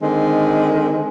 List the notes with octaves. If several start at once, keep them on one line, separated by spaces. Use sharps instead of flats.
D3 D#3 G#3 C4